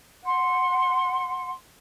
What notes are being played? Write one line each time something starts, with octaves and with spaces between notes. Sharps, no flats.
F#5 C6